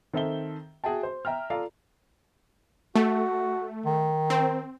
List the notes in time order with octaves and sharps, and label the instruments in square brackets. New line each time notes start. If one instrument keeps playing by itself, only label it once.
[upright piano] D#3 C4 A4 E5 G7
F#4 G#4 E5 G5 A5
C5
E5 G5 A#5 F6
F4 A4 D5 F5 A#5
[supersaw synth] A3 [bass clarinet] F#4
[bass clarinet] D#3
[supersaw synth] C4